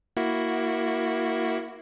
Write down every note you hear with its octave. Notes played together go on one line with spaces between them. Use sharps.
A#3 E4 F#4